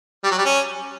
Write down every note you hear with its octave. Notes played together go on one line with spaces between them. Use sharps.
G3
F#3
G3
C#4